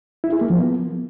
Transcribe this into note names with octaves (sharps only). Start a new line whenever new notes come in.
E4
G#4
A#3
F3
B3